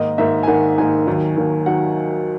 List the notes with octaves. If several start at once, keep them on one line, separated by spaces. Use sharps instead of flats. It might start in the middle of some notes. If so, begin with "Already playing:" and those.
Already playing: G#2 D#3 A#3 D#5
G#2 D#3 A#3 E5
G#5
G#2 D#3 A#3 F#5
G#2 D#3 A#3 G#5
D#2 D#3 F#3
D#2 D#3 F#3
D#3 F#3 F#5